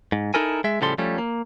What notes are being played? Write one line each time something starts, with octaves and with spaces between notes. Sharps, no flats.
G#2
D#4 E4 A4 A#4 G#5
G#3 E5
A2 C#3 F3 G3 A4 C6
F3 G3 A3 C#4
A#3